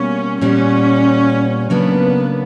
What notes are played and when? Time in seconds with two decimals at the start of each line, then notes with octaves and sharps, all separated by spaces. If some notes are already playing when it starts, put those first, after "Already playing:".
Already playing: B2 G3 A#3 C#4
0.41 A#2 G3 B3 C#4
1.70 C#3 F#3 A#3 B3 D4